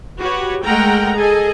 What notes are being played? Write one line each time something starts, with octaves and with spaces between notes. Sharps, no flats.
F#4 G4 B4 C#5
G#3 A3 A#4 F#5 G5 A#5
G#4 A4 D#5 G#5